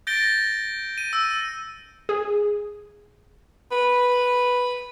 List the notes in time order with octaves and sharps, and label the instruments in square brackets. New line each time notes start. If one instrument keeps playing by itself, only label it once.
[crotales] G6 A6 A#6 D7 G7
D#7
E6
[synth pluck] G#4
[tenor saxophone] B4